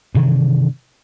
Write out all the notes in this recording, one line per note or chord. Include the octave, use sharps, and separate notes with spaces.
G2 C3 D#3 E3